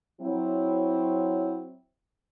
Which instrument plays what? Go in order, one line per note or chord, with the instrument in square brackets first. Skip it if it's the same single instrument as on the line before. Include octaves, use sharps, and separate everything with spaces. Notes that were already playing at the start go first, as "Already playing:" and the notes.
[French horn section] F#3 C4 E4